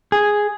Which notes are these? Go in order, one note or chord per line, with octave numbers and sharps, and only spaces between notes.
G#4